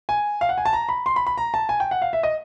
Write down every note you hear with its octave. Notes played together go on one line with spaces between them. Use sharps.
G#5
F5
F#5
G#5
A5
A#5
B5
C6
B5
B5
A#5
A5
G#5
G5
F#5
F5
E5
D#5